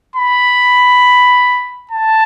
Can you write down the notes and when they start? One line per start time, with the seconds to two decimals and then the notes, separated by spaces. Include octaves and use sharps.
0.16 B5
1.91 A5